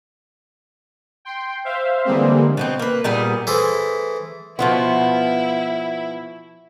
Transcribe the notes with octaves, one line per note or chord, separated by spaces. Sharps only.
G5 C6
C5 E5 F5
D3 E3 G3 G#3 A#3 C4
B2 F3 C4
A#3 B4
A#2 G3 B3 G#4
E3 A3 G#4 C5
B2 F3 B3 E4